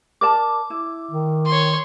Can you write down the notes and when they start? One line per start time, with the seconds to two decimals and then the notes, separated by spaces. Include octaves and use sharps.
0.21 A#4 D5 A5 D6
0.70 E4
1.11 D#3
1.47 C#5 C6